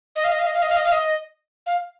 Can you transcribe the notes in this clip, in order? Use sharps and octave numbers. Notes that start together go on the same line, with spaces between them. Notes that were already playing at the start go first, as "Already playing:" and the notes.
D#5
F5
D#5
F5
D#5
F5
D#5
F5
D#5
F5
D#5
F5